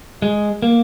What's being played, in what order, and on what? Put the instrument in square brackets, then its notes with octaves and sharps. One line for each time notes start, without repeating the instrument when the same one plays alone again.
[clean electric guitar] G#3
A#3